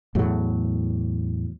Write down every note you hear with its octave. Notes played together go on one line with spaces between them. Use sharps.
E2 A2 F#3